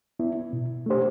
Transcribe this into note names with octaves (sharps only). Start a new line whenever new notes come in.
B3 E4
B2
A3 D4 G4 C5